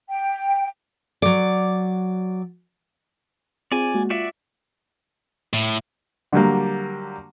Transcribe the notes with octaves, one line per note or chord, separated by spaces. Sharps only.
G5
F#3 D5
C4 F4 G#4 D5 G#5
G#3 A#3 F#4
F4 F#4 D5 E5
A2
D3 F#3 G3 A#3